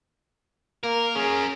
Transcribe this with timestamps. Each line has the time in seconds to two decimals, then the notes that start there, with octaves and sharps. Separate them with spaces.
0.84 A#3 A#4
1.15 C#4 G#4 A#4